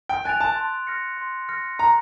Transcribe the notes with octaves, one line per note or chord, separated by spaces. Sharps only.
G5
G#5 F#6 A6 D7 F7
A5
C6
F6 A#6 C#7
C6
F6 A#6 C#7
A#5 B5